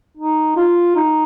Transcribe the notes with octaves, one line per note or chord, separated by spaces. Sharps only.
D#4
F4
D#4